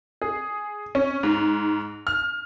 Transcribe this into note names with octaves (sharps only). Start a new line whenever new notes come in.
G#4
C#4
G#2
F6